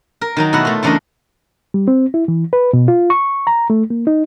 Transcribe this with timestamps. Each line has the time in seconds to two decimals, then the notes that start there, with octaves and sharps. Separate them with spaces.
0.21 A#4
0.37 D#3 F#3 D#4
0.53 B2 A3 E4 F#4 F#5
0.65 A3 F4
0.83 E2 C#3 A3 D4 A#4 D#5
1.74 G3
1.88 C4
2.14 E4
2.28 E3
2.53 B4
2.73 B2
2.88 F4
3.10 C#6
3.47 A#5
3.70 A3
3.90 A#3
4.07 D#4